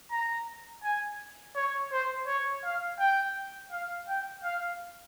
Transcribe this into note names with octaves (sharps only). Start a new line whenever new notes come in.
A#5
G#5
C#5
C5
C#5
F5
G5
F5
G5
F5